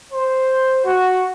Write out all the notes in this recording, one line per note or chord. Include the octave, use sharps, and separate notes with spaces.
C5
F#4